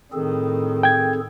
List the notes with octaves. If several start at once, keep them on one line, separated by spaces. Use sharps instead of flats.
A2 D#3 C4 G#4 A4
G5 G#6